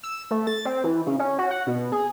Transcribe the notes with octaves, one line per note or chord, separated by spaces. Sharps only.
E6
A3
A6
C4
E3
C#3
C#4
F#4
F#5
B2
G#4